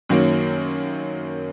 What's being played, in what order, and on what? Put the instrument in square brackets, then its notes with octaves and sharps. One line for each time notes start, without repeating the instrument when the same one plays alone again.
[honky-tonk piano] F#2 D#3 F#3 A#3